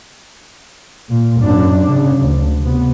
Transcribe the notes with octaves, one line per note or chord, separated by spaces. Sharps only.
A#2
F#2 D4
C#3
D2
C3 B3